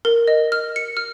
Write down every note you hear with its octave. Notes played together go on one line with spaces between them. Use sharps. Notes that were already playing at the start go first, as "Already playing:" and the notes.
A#4
D#5
F6
C#7
F6